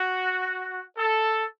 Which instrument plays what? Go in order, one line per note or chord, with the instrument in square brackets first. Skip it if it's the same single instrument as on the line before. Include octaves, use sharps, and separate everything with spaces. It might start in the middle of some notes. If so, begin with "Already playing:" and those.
Already playing: [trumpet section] F#4
A4